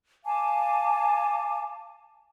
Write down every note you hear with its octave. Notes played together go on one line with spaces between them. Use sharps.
F5 G#5 A5 D6